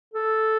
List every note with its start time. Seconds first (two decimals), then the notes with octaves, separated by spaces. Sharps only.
0.14 A4